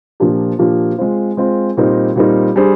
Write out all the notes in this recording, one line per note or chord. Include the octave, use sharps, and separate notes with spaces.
A#2 F3 A#3 D4 G4
A#2 F3 A#3 D4 G4
G#3 C4 F4 C5
G#3 C4 F4 C5
A#2 G3 C4 D#4 A#4
A#2 G3 C4 D#4 A#4
G3 D4 G#4 C5